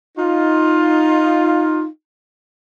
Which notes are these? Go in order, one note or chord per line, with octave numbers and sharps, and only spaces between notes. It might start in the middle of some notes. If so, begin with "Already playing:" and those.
D#4 F4